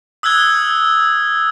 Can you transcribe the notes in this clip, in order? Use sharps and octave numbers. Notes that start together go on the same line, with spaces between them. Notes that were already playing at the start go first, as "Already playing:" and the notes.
D#6 E6 F#6 G#6 G7